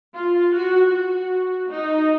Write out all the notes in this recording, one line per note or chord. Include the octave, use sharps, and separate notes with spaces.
F4
F#4
F#4
D#4